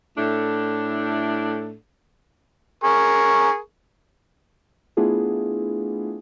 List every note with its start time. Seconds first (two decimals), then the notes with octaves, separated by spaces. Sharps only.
0.18 A2 A3 D4 E4 A4
2.84 G#4 A#4 C#6
4.97 A3 B3 D4 E4 F4 G#4